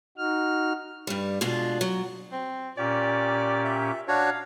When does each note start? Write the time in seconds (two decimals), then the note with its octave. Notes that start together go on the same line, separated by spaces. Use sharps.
0.18 D#4 F#4 F6
1.07 G2 G3
1.41 B2 G#3 D4 F4
1.81 F#3
2.32 C4
2.78 A#2 C#4 G4 D5
3.64 E5
4.08 D4 F#4 C#5 F5